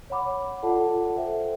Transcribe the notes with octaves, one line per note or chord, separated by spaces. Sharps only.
C#5 F#5 B5 D6
F4 A4 D5 F#5 A5
A4 C5 E5 G5